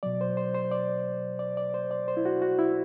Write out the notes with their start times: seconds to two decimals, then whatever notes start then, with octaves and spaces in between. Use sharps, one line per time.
0.03 B2 F#3 D5
0.21 C5
0.37 C5
0.54 C5
0.72 D5
1.39 D5
1.57 D5
1.74 C5
1.91 D5
2.08 C5
2.17 E4
2.25 F#4
2.42 F#4
2.59 E4